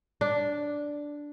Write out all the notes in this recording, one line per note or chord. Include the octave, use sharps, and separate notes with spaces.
D4